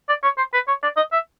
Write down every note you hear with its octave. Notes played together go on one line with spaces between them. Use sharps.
D5
C#5
C5
B4
C#5
D5
D#5
E5